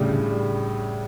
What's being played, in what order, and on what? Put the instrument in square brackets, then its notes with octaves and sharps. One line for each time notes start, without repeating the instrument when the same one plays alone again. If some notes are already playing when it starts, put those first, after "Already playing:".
Already playing: [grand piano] A2 C#3 G3 D4
C#3
G3